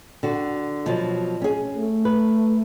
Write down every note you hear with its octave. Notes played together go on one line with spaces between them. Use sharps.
D3 F#4
B2 F3 F#3
C#4 G#4
A3
B4